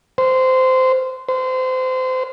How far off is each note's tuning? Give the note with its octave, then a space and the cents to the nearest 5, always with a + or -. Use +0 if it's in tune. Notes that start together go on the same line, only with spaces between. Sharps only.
C5 -15
C5 -25